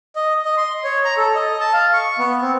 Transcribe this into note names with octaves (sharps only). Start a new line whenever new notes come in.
D#5
D#5
C6
C#5
A#5
A4
D#5
A5
F5
C#6
B3
C4